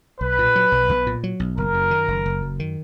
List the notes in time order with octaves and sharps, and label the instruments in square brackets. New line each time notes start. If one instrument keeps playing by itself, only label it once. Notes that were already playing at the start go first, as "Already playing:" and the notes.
[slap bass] B1 [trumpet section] B4
[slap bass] A#2
F#3
B1
B1
A#2
F#3
B1
[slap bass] F#1 [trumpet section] A#4
[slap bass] F#2
D#3
F#1
F#1
F#2
D#3